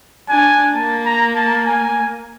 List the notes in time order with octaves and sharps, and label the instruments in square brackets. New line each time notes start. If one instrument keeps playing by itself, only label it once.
[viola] D4 [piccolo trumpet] G#5
[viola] A#3 [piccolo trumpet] A5
[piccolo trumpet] A#5
A5
G#5